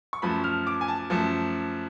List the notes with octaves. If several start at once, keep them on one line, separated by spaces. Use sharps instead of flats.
C#6
F#2 F3 A3 B5
F6
D6
G#5
A5
F#2 F3 A3